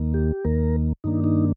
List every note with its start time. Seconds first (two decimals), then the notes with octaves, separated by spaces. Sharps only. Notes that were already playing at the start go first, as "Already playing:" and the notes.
Already playing: D#2 D#3 A#3
0.14 G4
0.45 D#2 D#3 A#3 A#4
1.04 G2 D#3 A#3 D4 D#4
1.24 D#4